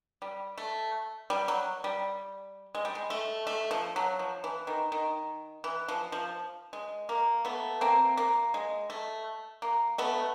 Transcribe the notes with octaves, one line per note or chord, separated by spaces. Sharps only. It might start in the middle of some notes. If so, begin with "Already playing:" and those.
G3
A3
G3
F#3
G3
G#3
G3
G#3
A3
A3
F3
F#3
F3
E3
D#3
D#3
E3
F3
F3
G#3
A#3
A3 B3
A#3 C4
A#3
G#3
A3
A#3
A3 B3